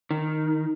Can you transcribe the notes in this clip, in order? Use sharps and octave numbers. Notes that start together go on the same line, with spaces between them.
D#3